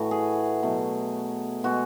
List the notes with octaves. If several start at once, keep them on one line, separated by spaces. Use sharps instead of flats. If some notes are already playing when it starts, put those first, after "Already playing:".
Already playing: A2 E3 A3 F#4
G#4
B2 F#3 A3
B2 G#3 F#4